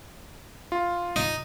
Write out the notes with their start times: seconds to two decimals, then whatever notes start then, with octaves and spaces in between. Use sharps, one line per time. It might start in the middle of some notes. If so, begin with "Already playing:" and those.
0.72 F4
1.16 D#4